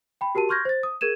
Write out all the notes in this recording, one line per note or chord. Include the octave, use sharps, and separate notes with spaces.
G5 B5
F#4 G4 A#4 A5 D#7
C6 C#6 F6 G6 G#6 A#6
C5 A6
D#6
G#4 A#4 G#6 D#7 E7